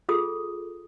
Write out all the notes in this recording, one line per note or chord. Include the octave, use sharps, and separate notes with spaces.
F4 G#4 A4 D#6